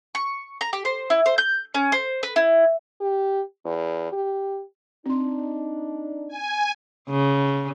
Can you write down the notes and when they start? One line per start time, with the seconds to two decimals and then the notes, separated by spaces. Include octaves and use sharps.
0.15 C#6
0.61 A#5
0.73 G4
0.85 C5
1.10 E4
1.26 C5
1.38 G6
1.74 C#4
1.92 C5
2.23 B4
2.36 E4
3.01 G4
3.65 E2
4.12 G4
5.06 C4 D4 D#4 C6
6.28 G#5
7.09 C#3